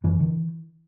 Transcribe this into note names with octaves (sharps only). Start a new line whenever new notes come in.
F#2 E3
D3